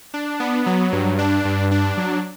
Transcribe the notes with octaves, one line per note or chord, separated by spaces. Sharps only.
D4
B3
F#3
G2
D4
G2
D4
F#3